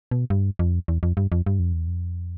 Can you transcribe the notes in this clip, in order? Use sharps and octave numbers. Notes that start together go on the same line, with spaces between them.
B2
G2
F2
E2
F2
G2
F2
G2
F2
E2
F2